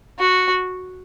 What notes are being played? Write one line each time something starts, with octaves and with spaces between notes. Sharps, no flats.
F#4